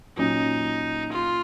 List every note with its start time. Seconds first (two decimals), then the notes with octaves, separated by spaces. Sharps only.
0.17 A#2 F#3 C#4 D#4
1.12 F4